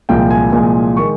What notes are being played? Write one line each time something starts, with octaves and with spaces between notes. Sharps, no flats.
C2 A#2 F3 G#3 G5
G#5
C2 A#2 F3 G#3
D#3 G#3 C#6